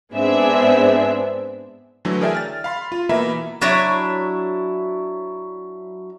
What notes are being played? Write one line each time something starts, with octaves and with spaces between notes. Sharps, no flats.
G#2 B3 C4 D4 G#4 E5
D3 E3 F#3 A3
G#4 A#4 D5 E5 G5 G#5
F6 A6
F5 B5 C6
F4
B2 E3 A#3 E5 A#5 B5
F#3 D4 E4 C#5